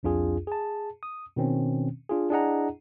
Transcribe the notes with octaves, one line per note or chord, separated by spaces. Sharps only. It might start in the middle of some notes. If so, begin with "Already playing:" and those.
C2 F2 D4 F4 G#4
G#4 A5
D#6
B2 D#3 C4 C#4
D4 F4 G#4
D4 E4 G#4 D#5 F#5 A#5